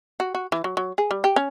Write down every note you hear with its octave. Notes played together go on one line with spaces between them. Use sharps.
F#4
F#4
E3
F#3
F#3
G#4
G3
G4
C#4